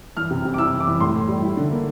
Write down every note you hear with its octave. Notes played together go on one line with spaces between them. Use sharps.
E3 F6
C3
C3
D6
E4 E6
E3
D6
E3
A2 C6
A2
G3
E4
D3
A#3